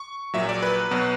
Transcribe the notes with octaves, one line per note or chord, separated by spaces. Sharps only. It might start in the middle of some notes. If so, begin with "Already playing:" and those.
Already playing: C#6
A#1 A#2 F#3 E5
D5
B4
B1 B2 F#3